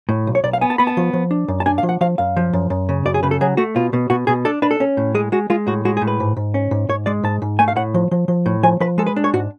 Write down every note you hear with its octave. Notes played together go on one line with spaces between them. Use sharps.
A2
B1
C#5
B1 D5
F5
B3 G#5
A5
B3 B5
A5
F3
F3
D4
F#2
A5
D4 G#5
F5
F3
F#5
F3 F5
F#2 F5
F3
F#2
F#2
C#3
F#2 D5
G#4
C#3 B4
A4
F#3 G#4
A3 F#4
B2 F4
B2
B2 F#4
B2 G#4
D4 A4
D4 B4
A4
C#4
A2
G#3 G#4
G#3 F#4
G#3 F4
A2 F#4
G#3 F#4
G#4
A2
B4
G#2
G#2
C#4
G#2
G#2 C#5
G#3 D5
G#2 A5
G#2
A3 G#5
F5
A2 F#5
F3
F3
F3
A2
F3 G#5
F3 B4
G#3 A4
B4
D4
C#5
G#2 F#4